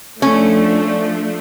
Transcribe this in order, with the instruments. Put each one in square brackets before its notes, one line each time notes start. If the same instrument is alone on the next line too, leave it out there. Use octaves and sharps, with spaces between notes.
[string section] F3 A3 D4 [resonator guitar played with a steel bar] C#4